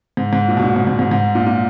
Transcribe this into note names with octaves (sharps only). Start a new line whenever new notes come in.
G#2
G#2
A#2
B2
A#2
G#2
G#2
G#2
G#2
A#2
A#2